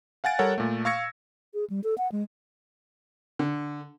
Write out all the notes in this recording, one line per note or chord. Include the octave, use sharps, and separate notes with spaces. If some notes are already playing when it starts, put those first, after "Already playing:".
F5 F#5 G#5 A6 D7
G3 A4 A#4 C#5 F#5
A#2 A3
F5 C#6 E6 G#6 A#6 C#7
G#4
G3
A4
F#5
G#3
D3